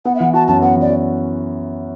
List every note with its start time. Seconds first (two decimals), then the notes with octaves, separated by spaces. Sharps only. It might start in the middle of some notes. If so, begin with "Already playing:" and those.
0.05 B3 F#5
0.15 E5
0.20 E3 F#5
0.34 F#4 A5
0.48 F#2 A5
0.62 B3 F#5
0.76 E3 D5
0.90 F#4